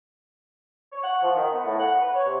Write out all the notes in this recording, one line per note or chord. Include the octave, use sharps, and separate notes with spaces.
C#5
F#5
F3
D#3
B3
A2
F#5
B4
C#5
C3